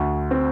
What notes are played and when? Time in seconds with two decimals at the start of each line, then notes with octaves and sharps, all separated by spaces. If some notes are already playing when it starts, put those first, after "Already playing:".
Already playing: D2
0.31 C4